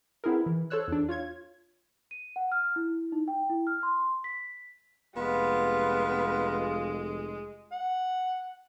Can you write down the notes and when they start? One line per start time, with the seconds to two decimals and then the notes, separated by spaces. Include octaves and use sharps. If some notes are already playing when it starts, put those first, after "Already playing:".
0.24 B3 C4 E4 G#4 A#4
0.46 E3
0.70 A4 C5 C#5 E6 F#6
0.88 E2 D4
1.09 F4 C#5 G#6
2.11 D#7
2.36 F#5
2.52 F6
2.76 E4
3.12 D#4
3.28 G5
3.50 E4
3.67 F6
3.83 C6
4.24 B6
5.17 F1 G#3 B3 F4
7.72 F#5